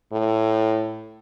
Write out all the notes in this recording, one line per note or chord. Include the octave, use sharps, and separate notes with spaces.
A2